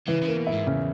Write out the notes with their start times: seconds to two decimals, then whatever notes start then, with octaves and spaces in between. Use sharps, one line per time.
0.07 C#3 E3
0.23 C#3
0.28 A#3
0.37 B2
0.47 E4
0.52 G#2
0.67 E2 C#3